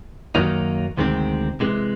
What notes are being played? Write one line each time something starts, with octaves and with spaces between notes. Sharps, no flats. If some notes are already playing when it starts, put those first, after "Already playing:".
F#2 D#3 F#3 A#3 D#4
D2 C3 D#3 G#3 C4
C3 E3 G#3